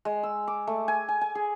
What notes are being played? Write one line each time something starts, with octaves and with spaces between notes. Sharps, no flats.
G#3
E6
D6
A3
G#5
G#5
G#5
G#4